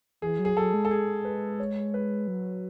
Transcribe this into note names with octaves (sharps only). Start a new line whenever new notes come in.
E3 G#4
F#3
G#4
F#3 A4
G#3
A4
G#4
B4
C#5
B4
F#3